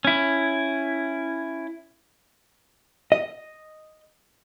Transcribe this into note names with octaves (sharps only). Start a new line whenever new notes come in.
C#4 E4
D#5